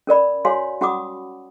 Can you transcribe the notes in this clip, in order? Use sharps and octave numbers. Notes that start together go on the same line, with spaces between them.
C#4 A#4 D5 B5
F#4 C#5 F5 G#5 C6
C#4 F#4 F#5 B5 D6 D#6